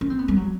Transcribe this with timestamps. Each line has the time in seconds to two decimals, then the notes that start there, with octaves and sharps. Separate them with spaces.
0.01 C#4
0.10 C4
0.19 B3
0.28 G3
0.37 F#3